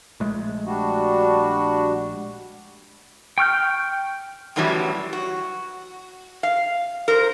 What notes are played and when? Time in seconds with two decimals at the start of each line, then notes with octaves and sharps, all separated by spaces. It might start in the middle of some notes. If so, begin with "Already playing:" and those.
0.20 A#1 G#3 A3
0.66 G3 D4 F#4
3.38 G5 C#6 F6 G6
4.56 F#2 A2 E3 F#3 G3
5.13 F#4
6.43 F5
7.08 A#4 C5